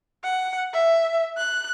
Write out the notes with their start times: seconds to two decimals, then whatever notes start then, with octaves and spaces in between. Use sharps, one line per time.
0.24 F#5
0.74 E5
1.37 F#6